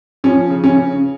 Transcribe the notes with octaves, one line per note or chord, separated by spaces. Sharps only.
F3 C#4
C#3
C#4
C#3